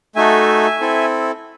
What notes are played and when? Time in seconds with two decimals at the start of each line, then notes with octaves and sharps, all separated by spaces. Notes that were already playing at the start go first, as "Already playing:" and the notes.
0.16 A3 D#4 F#4 A4 E5 G#5
0.80 C4 E4 A4